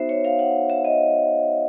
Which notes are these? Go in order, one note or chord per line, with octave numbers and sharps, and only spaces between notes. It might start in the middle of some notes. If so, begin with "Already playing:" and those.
Already playing: B3 D#4 F#4 C5 E5
C#5
F5
F#5
E5
D#5